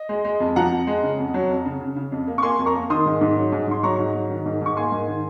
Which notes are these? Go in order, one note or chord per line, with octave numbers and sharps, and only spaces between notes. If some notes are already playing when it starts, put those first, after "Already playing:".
Already playing: D#5
G#3
G#3
F2
F3 F#5 A#5
F2
G#3
C#3
F2
F#3
F2
C#3
C#3
C#3
F2
A#3
C#6
A#3 G#5 C6
F2
A#5 C#6
A#3
D#3 C6 D#6
G#2
G#2
F#3
G#2
G#2 C6
F#3 A#5 C#6
G#2
F#3
D#3
G#2
G#2 C#6
A#3 G#5 C6
G#2
D#3